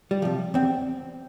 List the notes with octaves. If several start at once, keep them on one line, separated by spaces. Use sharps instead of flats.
G3
C3 F3
E2 C4